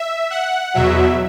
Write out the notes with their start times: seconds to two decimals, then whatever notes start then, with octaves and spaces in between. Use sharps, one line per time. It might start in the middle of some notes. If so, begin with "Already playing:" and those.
Already playing: E5
0.31 F#5
0.74 E2 B2 F#3 E5